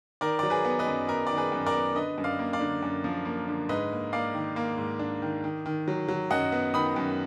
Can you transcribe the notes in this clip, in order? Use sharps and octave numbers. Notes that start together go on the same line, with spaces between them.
D#3 A#4 D5
F#3 D5
G#4 B4
B3
B4 D#5
F#2
B3 A#4
D#3 D5
G#4 B4
F#2
A#4 D5
B3
D3 B4 D#5
F#2
D5 F5
A#3
D5 F5
D3
F#2
F3
A#3
D3
G#2 B4 D#5
A#3
A#3 D5 F5
D#3
A#3
G#2
D4
D#3
D#3
D#3
F#3
F#3
F#2 D#5 F#5
B3
D#3 B5 D#6
F#2